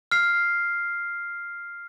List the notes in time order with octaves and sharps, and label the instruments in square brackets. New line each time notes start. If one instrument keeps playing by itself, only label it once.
[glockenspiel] F6 C7